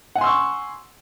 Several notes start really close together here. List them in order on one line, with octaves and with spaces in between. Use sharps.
F#5 G#5 C6 E6 C#6